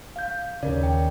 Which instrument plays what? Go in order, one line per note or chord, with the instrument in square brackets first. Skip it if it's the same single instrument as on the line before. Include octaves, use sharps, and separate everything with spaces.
[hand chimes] F5 G6
[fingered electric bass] D#2 C#3 [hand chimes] A#4 D5
[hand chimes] G5